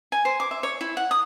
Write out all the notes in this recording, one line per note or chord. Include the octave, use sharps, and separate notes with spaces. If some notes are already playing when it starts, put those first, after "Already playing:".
G#5
C5
D6
E5
C#5
E4
F#5
D#6